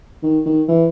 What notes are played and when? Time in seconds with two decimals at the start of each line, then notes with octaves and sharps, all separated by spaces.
0.23 D#3
0.46 D#3
0.69 E3